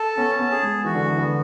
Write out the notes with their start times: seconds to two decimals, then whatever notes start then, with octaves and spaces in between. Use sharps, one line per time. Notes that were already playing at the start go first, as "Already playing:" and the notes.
Already playing: A4 A5
0.17 B3 C#4
0.39 B3
0.51 G#4
0.62 G#3
0.85 E3 F#4
0.95 D3
1.05 E3
1.18 D3 B3